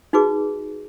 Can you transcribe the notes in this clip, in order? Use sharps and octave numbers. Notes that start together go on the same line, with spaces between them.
D#4 F#4 G#4 B4 D6